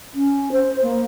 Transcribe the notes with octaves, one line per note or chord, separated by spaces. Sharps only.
C#4
C5
A#3